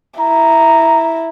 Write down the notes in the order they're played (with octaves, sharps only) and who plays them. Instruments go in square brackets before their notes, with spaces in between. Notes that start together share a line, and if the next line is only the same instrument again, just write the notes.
[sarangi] E4 [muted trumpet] A#5